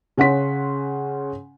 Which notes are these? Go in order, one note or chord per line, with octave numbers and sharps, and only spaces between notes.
C#3 C#4 F#5 C6 B6